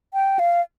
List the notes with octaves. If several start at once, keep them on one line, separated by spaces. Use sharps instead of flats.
G5
F5